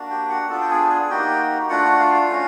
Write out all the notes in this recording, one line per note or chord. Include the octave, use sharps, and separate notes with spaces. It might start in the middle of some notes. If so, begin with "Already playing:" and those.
Already playing: A#3 D4 F#4
G4 G5
F#4 F#5
B3 D4 F4 A4 A5
G5
G#4 G#5
G#4 G#5
A#3 D#4 F#4 G4 G5
A3 D4 F4 F#4 F#5
F4 F5
A3 C#4 F#4